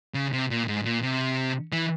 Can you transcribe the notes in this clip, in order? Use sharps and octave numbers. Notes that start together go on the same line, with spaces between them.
C#3
C3
A#2
G#2
A#2
C3
E3